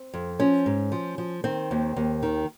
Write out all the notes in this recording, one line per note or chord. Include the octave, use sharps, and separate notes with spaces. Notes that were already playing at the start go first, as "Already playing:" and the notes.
Already playing: C4
F2
F3 C#4
G#2
F3
F3
D#3 C4
D#2
D#2
D#3